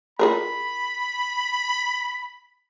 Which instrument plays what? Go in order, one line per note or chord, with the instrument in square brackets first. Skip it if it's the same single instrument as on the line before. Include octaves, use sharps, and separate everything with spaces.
[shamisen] F4 G#4 A#4 [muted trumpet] B5